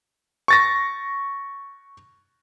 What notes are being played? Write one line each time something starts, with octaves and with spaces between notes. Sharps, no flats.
C#6 A6 A#6